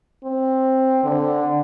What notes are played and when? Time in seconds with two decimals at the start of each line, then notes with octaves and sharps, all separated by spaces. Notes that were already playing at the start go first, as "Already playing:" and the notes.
0.24 C4
1.04 D3